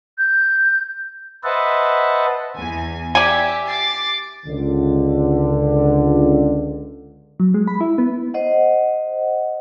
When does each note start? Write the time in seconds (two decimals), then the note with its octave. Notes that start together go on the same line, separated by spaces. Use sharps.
0.18 G6
1.44 B4 C5 D#5 E5 F#5 A5
2.57 E2 G#5
3.15 G4 D5 E5 G#5
3.66 D6 A6 C7
4.46 C#2 D3
7.40 F#3
7.54 G#3
7.68 B5
7.81 E4
7.98 B3
8.34 C5 D#5 F#5